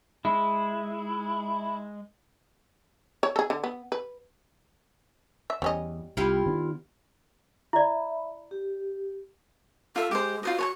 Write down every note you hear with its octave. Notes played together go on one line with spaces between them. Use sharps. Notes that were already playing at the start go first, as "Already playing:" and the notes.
G#3 E4
C#5
G#4 A4
D3
B3
B4
E5
E2 G3 C#4 D#5
C2 E4 F4 G4
D#3 B3 D4
E4 D5 E5 B5
G4
F4 A4 E5
G#3 G4 C5
F4 F#4 C5 D#5
C#5 G#5 C#6